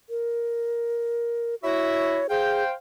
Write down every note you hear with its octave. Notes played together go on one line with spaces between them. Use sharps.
A#4
E4 F#4 C#5 E5
G#4 C5 F5 G5